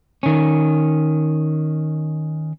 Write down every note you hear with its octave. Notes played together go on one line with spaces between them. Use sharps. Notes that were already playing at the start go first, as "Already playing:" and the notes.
D#3 C#4